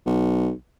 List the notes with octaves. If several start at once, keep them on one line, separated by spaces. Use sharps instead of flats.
B1